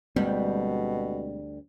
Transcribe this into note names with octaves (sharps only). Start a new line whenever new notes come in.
D2 B2 G3 G#3 A#3 C4